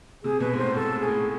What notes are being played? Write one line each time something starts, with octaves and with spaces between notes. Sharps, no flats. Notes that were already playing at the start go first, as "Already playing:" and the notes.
C3 G#4
B2 B4
G#2
A2 C5
G#2 A4
A2
G#4
A2